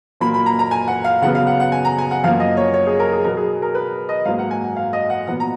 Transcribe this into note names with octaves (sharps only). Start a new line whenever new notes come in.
A#2 F#3 A#3 B5
B5
A#5
A#5
G#5
F#5
F5
C#3 F#3 B3 F#5
F5
F#5
F#5
G#5
A#5
G#5
F#5
F#2 F3 A#3 F5
D#5
C#5
C#5
G#4
A#4
G#4
B2 F#3 B3 A#4
G#4
A#4
B4
D#5
G#2 F#3 A#3 F5
F#5
G#5
F#5
F5
D#5
F#5
A#2 F#3 B3 F#5
A#5